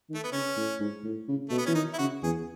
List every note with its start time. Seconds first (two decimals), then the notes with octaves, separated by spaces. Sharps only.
0.09 D#3
0.14 A3
0.24 B3
0.32 C#3 C#4
0.56 A2
0.80 G#2
1.04 A2
1.28 C#3
1.49 B2 A3
1.58 B3
1.66 E3 C#4
1.75 D#3 D#4
1.93 E4
1.98 C#3 F#4
2.22 E2 G#4